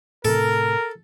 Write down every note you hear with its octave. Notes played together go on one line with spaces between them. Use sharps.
A2 C3 A4 A#4